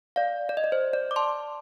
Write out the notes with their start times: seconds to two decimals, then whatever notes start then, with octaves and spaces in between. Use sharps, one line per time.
0.16 D5 F5
0.49 D5
0.57 D#5
0.64 D5
0.72 C5
0.93 D5
1.11 D6
1.16 A5 C6